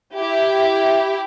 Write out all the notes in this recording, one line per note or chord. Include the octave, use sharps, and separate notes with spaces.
E4 G4